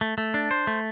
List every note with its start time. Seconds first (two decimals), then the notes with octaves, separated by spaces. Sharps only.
0.01 A3
0.18 A3
0.34 D4
0.51 C5
0.67 A3